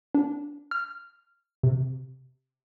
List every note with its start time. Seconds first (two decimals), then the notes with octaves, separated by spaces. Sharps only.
0.15 D4
0.71 F6
1.63 C3